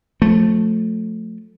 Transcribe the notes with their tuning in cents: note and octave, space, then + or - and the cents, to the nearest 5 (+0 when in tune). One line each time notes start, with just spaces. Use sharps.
F3 +30 A3 +0